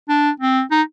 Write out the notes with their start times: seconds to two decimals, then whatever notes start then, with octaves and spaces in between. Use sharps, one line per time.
0.09 D4
0.40 C4
0.71 D#4